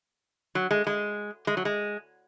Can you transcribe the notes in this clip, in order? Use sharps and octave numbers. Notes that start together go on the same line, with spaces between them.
F#3
G#3
G#3
G#3
F#3
G#3